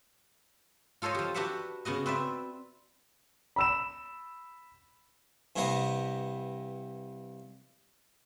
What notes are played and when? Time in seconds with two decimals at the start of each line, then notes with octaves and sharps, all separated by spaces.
1.02 F4 A4 C5 C#5 D#5
1.15 F3 G4
1.34 D4 F#4 G4 B4 E5 F#5
1.85 C#3 B3 F#4 D#5
2.06 C4 B4 D5 E5
3.56 B5 E6 E7
5.56 G2 C3 E3 B3 D#5